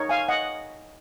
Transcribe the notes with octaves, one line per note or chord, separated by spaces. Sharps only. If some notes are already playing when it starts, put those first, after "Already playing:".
Already playing: D#4 A#4 C#5
F5 G#5
D#5 F#5